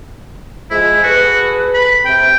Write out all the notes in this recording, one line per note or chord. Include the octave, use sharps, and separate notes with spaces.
F3 G#3 E4
F#4 G#4 A4 B4
B5
C3 G5